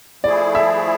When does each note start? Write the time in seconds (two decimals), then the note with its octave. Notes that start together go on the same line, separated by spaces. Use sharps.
0.23 F3 A3 E4 G#4 D5
0.55 E5